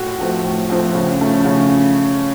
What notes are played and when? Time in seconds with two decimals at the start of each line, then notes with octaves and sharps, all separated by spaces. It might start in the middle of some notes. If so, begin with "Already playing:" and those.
Already playing: A2 F#4
0.19 F3 A3 C4
0.44 A2
0.70 F3 A3 C4
0.95 C#3
1.21 F3 A3 C#4
1.45 C#3